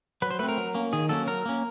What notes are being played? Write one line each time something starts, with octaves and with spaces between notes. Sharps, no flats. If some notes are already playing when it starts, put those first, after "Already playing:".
F#3 B4
C5
A3 C4 B4
A#4
F#3
A#3 C#4
D#3 G#4
F#3 A#3 C#4 A4
F#3 A#4
A#3 C#4